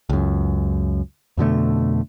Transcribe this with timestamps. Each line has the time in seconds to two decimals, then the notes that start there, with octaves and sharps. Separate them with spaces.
0.09 C#2 F#2
1.37 F2 B2 D3 A3